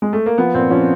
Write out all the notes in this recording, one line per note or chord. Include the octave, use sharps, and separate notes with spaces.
G#3
A3
A#3
F3 B3
A#2 C4
F3 C#4